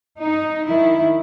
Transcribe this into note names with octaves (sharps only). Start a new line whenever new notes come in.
D#4
D#3 E4